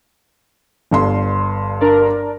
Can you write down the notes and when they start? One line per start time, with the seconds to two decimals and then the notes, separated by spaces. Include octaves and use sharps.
0.91 G1 G2 C6
1.81 D4 A#4 D5